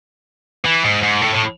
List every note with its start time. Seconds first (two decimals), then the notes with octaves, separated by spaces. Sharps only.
0.65 E3
0.84 G#2
1.03 G#2
1.22 A2
1.35 A2